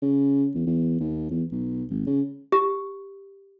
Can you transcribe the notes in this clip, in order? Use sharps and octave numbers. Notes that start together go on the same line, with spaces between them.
C#3
E2
E2
D#2
E2
B1
G#1
C#3
G4